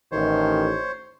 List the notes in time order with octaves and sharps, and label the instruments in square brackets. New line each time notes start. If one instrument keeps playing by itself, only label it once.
[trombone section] A1 D#3 [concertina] C5 C#5